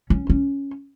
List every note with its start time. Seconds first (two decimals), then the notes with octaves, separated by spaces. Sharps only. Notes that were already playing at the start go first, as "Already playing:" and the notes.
0.10 C#4
0.30 C#4